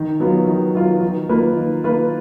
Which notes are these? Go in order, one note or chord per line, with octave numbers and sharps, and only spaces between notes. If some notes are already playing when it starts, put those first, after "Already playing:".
Already playing: D#3
F#3 B3 F4
D#3
F#3 B3 F4
D#3
A#3 F4 B4
D#3
A#3 F4 B4